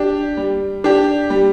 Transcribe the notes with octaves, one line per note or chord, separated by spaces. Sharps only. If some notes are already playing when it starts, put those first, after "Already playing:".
Already playing: D4 G4
G3
D4 G4
G3